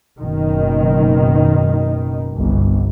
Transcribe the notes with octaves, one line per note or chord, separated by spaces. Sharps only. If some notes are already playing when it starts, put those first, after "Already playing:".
F#1 B2 D#3
G1 C2